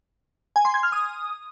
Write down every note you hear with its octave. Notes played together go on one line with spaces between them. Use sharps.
G#5
C6
G#6
F6
D#6